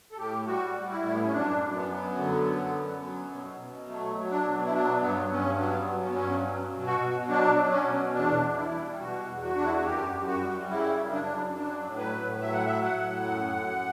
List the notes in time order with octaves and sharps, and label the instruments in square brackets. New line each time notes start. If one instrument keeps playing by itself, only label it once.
[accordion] A4
A2 G4
G3 F#4
G3
E4
A2 A3
B3
C#4
F#2 D4
F#2
B3
F#3
D3
F#2
F#2
F#3
B2
B2
F#3 A3
F#3
D4
B2
E4
F#3 D4
G2 B3
B3
G2 C#4
F#3 B3
F#3
C#4
B3
G2 C#4
F#3
B2
F#4
B2
F#3 D4
F#3
C#4
B2
E2 D4
E2
E4
G3
B2 F#4
E2
F#4
E2 D4
E4
F#4
F#2 G4
F#2
F#4
G3
C#3 E4
F#2
D4
F#2
F#3 D4
A2
B4
A2
F#3 E5
F#5
F#3 E5
F#5
A2
F#2
F#2